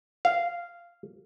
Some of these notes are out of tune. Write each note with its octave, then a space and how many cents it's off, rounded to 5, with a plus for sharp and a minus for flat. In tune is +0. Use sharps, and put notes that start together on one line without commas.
F5 -10